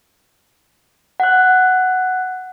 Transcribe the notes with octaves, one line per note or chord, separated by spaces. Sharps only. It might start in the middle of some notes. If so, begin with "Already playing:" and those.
F#5 F#6